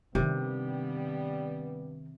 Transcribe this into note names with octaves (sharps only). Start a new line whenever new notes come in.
G2 C3 D#3 G3 B3 D#4